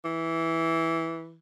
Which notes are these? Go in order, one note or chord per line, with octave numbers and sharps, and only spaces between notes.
E3